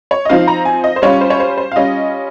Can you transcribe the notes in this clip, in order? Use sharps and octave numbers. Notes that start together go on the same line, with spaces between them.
C#5
D#5
F3 C4 D#4 F5
A#5
G#5
D#5
C5
G3 C#4 F4 C#5
C5
C#5
C5
C5
F5
G3 C#4 F4 D#5